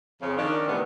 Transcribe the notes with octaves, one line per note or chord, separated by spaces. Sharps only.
F2 C#3
D#3 C#4 D4
A2 C3 D#3 E3 A3 B3